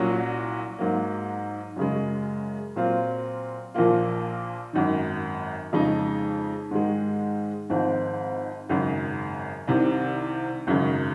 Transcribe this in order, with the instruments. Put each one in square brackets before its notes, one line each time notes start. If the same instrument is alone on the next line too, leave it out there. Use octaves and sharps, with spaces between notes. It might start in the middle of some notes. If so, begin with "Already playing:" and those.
Already playing: [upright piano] C2 A#2 F#3 C#4 F#4
G#2 F#3 A#3
F#2 C#3 G#3
A#2 F#3 C4 F4
A#1 A#2 F3 A#3 F4
G#1 F#2 D#3
F2 C#3 G#3 D#4
G#2 D#3 G#3
G#1 G#2 F3 C4
G#1 F#2 C#3
C2 C3 D#3
G#1 F#2 C#3